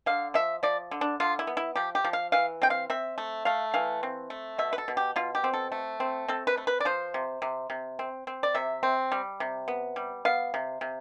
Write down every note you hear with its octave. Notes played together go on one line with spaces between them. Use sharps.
D3 F5
F3 E5
F3 D5
D3
D4
D3 F4
E4
B3
E4
F3 G4
G4
F3
F5
E3 F5
C4 G5
F5
C4 E5
A3
A3 F5
E3 F5
C4
A3
B2 E5
B4
A4
B2
G4
B2 F4
G4
C4
A4
A3
C4
C4 A4
B4
A3
B4
D5
F3 C5
C3
C3
C3
C4
C4
D5
C3 E5
C4
G3
C3
B3
G3
B3 F5
C3
C3